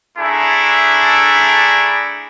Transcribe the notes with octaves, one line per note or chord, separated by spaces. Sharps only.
A3 D4 E4 G#4 A#5